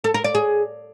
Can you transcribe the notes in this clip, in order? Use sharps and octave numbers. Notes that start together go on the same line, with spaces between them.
A4
A#4
D5
G#4